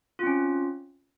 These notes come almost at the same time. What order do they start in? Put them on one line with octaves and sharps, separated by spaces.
F4 C4 C#4